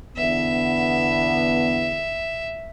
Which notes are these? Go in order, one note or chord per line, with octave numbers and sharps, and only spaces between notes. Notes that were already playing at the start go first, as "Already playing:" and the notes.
E2 D3 B3 E5